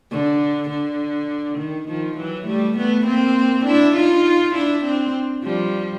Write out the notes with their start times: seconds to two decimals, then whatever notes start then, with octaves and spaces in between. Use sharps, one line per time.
0.11 D3
0.70 D3
1.58 D#3
1.88 D#3 F3
2.17 E3 F#3
2.47 G3 A3
2.78 A3 B3
3.06 A#3 C4
3.65 D4 E4
3.96 D#4 F4
4.54 D4 E4
4.84 C4 D4
5.43 F3 G3